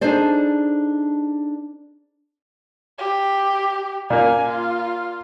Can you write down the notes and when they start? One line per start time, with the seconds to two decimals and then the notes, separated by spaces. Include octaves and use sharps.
0.01 D4 D#4 G#4 A4 C5 D5
2.99 G4
4.10 A#2 A#3 G#5
4.49 F4